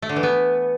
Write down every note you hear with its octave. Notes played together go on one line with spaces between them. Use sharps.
A3
D3
E3
B3